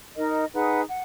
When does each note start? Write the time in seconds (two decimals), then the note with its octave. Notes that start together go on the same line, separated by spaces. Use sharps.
0.16 D#4 A#4 D#5
0.53 D#4 G#4 B4 F#5
0.89 F#5